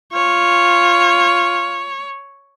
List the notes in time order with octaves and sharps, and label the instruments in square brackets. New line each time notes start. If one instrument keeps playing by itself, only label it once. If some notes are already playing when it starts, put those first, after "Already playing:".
[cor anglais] F4 [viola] C#5